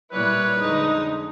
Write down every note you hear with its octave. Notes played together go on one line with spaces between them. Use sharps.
A#2 G3 E4 B4 C#5 F#6
F2 D3 G#3 D#4 D#6